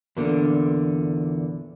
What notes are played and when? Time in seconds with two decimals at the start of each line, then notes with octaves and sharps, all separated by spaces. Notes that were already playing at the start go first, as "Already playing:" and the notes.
0.17 E2 A#2 D3